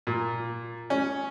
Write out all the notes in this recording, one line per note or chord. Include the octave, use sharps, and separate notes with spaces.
A#2
C#4